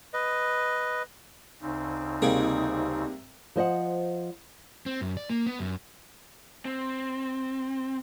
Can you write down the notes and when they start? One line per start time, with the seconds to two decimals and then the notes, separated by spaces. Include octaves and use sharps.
0.13 B4 D#5
1.61 D2 C#3 C4 D#4
2.22 C3 G3 A#3 G#4
3.56 F3 C5 D#5 F#5
4.86 C4
5.01 F#2
5.17 D5
5.29 A#3
5.46 B3
5.59 F#2
6.65 C4